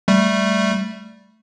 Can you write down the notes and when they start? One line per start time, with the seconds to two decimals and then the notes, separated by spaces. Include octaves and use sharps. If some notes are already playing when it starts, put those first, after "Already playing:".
0.08 G3 A3